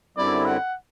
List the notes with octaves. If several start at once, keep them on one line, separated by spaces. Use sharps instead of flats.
F#2 D3 G3 C4 E4 D5
F#5